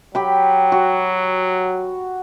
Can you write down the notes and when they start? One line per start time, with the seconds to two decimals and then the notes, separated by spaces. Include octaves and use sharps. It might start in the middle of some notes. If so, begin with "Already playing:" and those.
0.15 F#3 G4 B5
0.72 F#4